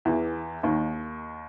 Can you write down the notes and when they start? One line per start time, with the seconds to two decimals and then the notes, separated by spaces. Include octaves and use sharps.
0.05 E2 E3
0.63 D#2 D#3